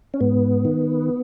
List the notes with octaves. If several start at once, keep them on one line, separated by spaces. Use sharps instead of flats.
C#4
G#2 B3
D#3